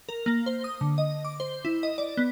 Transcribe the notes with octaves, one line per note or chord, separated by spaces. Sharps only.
A#4
A#3
C5
D#6
D3
D#5
D6
C5
E4
D#5
D5
B3